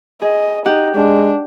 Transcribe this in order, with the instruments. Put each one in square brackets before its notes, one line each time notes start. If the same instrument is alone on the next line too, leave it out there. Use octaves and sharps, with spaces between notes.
[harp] G#4 [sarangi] D#5
[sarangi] D#4 [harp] G4 F#5
[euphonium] G#3 [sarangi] D4